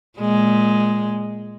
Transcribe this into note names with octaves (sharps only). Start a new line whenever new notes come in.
A#2 G#3